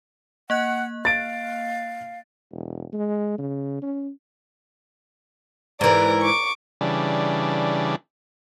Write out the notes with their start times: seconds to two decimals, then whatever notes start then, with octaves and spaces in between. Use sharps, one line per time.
0.50 A#3 D#5 F#5 F#6
1.05 F5 A6 D7
2.51 E1
2.93 G#3
3.38 C#3
3.82 C#4
5.81 G#2 E3 A#4 D5
6.21 C#6 D6
6.81 C#3 E3 G3 D4